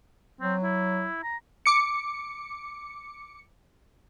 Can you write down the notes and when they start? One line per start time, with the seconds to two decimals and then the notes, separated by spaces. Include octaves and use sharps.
0.41 F#3 C4
0.63 E4
1.23 A#5
1.66 D6 C#7